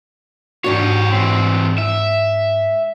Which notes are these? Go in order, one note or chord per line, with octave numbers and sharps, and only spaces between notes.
G#2 D4 F#4 G4 C#5
E3 C4
E5